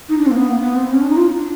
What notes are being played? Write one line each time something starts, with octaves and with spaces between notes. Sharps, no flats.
D#4
D4
C4
A#3
B3
A#3
B3
C4
C#4
D4
D#4
F4
D4